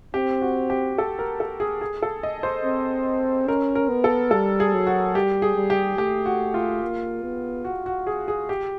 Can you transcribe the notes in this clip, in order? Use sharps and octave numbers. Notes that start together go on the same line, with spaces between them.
C4 G4
F#4
G4
A4
A#4
A4
G#4
G#4
A4
D#5
C5
C4
C#4 A#4
A#4
B3
A4
G3 A4
G#4
F#3
F#4
G3 G4
G#4
G3
G4
A3 G4
F#4
F4
A#3
B3
F#4
F#4
G#4
G#4
G4